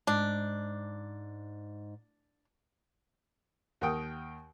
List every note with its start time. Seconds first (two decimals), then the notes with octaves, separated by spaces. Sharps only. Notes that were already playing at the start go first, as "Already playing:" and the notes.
0.07 G#2 D4
3.81 D#2 A#4 F#5 G5 D#6